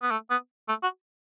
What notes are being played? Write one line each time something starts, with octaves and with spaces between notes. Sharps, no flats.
B3
A3
B3
A3
F#4